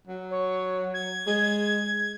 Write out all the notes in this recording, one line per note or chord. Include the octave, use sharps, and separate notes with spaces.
F#3
C#5
G#6
G#3